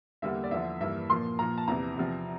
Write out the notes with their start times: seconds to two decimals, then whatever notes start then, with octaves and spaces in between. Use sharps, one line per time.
0.22 E2 D3 G3 A#3 E5
0.44 D5
0.51 E2 D3 F3 E5
0.81 G2 E3 A#3 E5
1.10 A#2 F3 A#3 C6
1.39 A#2 F3 A#3 A#5
1.58 A5
1.68 E2 C3 E3 A#5
1.97 E2 C3 F3 C4